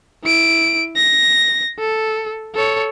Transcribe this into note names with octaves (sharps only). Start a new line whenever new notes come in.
E4 D7
A#6
A4
A4 C#5